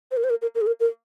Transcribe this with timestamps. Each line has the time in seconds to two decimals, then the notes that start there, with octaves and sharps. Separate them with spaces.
0.11 C5
0.17 A#4
0.24 C5
0.30 A#4
0.42 A#4
0.55 A#4
0.61 G#4
0.67 A#4
0.80 A#4